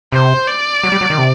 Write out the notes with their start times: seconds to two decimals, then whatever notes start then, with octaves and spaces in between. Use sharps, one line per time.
0.12 C3 C5
0.47 D5
0.84 F#3
0.92 G3
1.01 F#3
1.10 D#3
1.18 C3